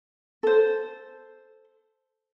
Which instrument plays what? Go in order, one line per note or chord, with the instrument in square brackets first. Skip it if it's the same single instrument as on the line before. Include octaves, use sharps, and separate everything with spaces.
[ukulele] A4 C5